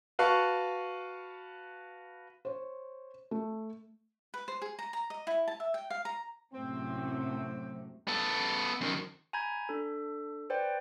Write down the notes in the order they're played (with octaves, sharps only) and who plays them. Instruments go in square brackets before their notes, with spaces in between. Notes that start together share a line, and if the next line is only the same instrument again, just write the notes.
[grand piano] F#4 B4 F5 A5 C#6
[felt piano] C5 C#5
A3
[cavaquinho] B4
C5
G#4
A#5
A#5
D#5
E4
A5
E5
G5
F5
A#5
[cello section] F#2 A2 C3 [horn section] C4
[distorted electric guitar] B3 A4
F#2 D#3
[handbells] G#5 A#5 B5 G6 G#6
D4 A4
B4 C5 D5 G5